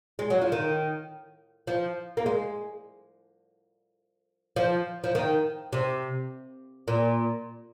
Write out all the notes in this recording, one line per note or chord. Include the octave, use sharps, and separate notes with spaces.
G#3
F#3
F3
D#3
F3
A#3
G#3
F3
F3
D#3
C3
A#2